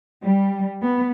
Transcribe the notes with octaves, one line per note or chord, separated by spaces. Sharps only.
G3
B3